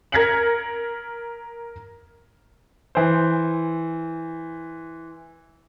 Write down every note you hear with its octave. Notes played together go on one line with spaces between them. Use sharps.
A#4 G#6 A#6 B6 C#7 F#7
E3 C5